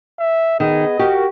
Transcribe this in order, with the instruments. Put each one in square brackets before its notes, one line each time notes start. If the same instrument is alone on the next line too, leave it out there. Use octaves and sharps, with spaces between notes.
[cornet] E5
[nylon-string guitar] D#3 [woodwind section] B3 G#4 [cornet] D#5
[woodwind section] F#4 A#4 [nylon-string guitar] G4